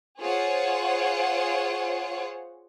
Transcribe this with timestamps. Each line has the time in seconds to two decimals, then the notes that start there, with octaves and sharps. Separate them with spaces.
0.20 F4 G#4 C5 C#5 F#5